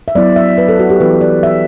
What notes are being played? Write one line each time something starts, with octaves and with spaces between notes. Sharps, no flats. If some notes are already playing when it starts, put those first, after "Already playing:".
E5
F#3 B3 E4 D5
E5
B4
A4
F#4
G4
E3 B3 E4 B4
D5
E5